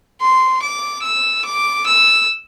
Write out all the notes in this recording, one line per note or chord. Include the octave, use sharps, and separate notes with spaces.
C6
D6
E6
D6
E6